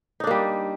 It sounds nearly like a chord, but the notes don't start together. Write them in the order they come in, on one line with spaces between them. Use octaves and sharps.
D#4 D4 A#3 G3